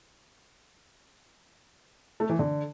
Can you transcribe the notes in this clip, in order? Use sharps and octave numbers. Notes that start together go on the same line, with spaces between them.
A3
E3
D3